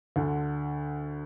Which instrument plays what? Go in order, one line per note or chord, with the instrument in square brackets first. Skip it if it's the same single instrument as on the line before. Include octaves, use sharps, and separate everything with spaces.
[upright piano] D2 D3